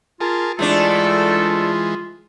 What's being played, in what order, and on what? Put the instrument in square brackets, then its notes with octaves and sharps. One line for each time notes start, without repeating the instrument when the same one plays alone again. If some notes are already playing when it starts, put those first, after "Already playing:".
[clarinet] F4 [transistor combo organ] G#4 A#4 A5
[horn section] G#2 A4 [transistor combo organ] E3 G#3 [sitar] A3 D4 [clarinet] F4